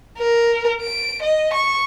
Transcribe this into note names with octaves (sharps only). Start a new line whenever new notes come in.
A#4
D7
D#5
C#6